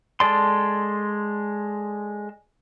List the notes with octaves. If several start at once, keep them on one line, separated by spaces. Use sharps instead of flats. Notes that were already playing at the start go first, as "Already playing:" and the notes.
G#3 A4 D5 C6